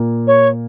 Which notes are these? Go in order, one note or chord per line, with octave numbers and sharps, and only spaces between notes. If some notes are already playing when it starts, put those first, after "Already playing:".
Already playing: A#2 A#3
C#5